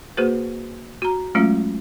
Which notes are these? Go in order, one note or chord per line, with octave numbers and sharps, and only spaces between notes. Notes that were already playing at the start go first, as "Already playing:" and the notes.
A#3 F#4 G#4 B4 C5
F#4 A#5
F#3 G#3 A3 C#4 F4